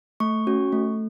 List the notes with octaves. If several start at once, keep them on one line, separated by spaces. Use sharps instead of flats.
A3 C#6
C#4 F#4
A3